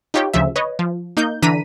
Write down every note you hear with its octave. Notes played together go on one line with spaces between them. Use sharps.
D#4 F4 G4 C#5 G5
D2 C#3 F3 E5
B4 C#5 D#5
F3
A#3 D#4 G6
D3 E3 D4 A#5 B6 D#7